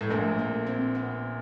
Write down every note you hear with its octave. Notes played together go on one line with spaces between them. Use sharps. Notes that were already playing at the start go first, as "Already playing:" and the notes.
A2 G#3
A#1 A#2 A3
A#3
C4
B3